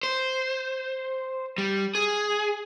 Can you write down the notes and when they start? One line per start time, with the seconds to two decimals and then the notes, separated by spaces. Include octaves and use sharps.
0.03 C5
1.58 G3
1.95 G#4